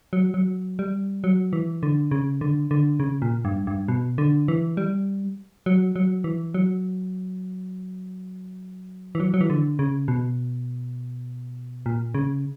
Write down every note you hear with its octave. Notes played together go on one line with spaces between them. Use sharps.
F#3
F#3
G3
F#3
E3
D3
C#3
D3
D3
C#3
A#2
G2
G2
B2
D3
E3
G3
F#3
F#3
E3
F#3
E3
F#3
F#3
E3
D3
C#3
B2
A#2
C#3